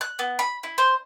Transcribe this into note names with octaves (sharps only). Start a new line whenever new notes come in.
F#6
B3
B5
E4
C5